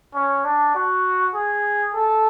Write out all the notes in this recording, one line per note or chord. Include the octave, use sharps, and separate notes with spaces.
C#4
D4
F#4
G#4
A4